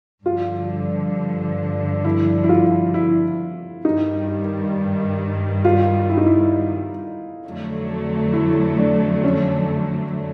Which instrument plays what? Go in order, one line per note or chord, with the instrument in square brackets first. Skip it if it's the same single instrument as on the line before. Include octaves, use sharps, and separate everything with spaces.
[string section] G2 D3 F3 [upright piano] F4
[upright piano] E4
E4
F4
E4
[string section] G2 D#3 G3 [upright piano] D#4
[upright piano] F4
E4
D#4
E4
[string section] F2 D3 F#3 A3
[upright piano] E4
D4
C#4